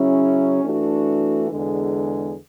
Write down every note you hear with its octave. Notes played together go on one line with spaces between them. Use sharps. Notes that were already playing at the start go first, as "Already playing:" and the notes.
Already playing: C#3 F#3 C#4 E4
E3 A3 D4 F#4
E2 D3 G#3